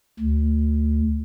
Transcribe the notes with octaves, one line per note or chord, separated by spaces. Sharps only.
D2